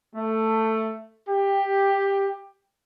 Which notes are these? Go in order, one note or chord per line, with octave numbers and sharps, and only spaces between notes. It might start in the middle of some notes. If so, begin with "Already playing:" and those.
A3
G4